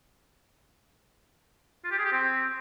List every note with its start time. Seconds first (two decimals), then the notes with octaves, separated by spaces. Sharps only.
1.84 F4
1.91 G4
1.98 G#4
2.05 G4
2.12 C4